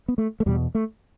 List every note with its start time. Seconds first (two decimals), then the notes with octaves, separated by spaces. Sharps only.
0.08 B3
0.18 A3
0.40 A3
0.46 E2 B2 G3
0.75 A3